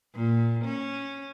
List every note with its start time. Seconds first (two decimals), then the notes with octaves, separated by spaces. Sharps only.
0.15 A#2
0.64 C#4